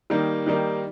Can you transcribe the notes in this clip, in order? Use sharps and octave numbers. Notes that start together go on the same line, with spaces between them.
D#3 G3 A#3 D#4
D#3 G3 A#3 D#4